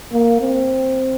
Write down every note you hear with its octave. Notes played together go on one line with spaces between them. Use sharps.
A#3
C4